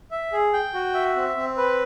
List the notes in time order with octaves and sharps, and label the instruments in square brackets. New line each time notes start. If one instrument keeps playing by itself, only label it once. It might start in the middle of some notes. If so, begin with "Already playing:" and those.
[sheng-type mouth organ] E5
G#4
G5
F#4
E5
C4
C4
B4